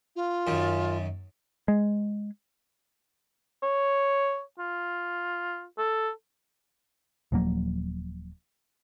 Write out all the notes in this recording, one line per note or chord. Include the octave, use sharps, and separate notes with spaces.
F4
F#2 D#3
G#3
C#5
F4
A4
D#1 F3 F#3 A#3